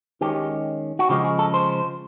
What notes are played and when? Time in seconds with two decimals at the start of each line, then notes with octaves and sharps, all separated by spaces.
0.21 D#3 G#3 C#4 G4
0.99 F#4
1.09 C#3 F3 G#3 G4
1.24 G#4
1.39 A4
1.54 C5